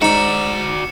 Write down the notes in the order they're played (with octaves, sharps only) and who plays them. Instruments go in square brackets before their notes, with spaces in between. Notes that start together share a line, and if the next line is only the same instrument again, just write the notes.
[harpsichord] G#2 B5 [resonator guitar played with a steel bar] D#4 [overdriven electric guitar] F#4 D5 [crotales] C#7 E7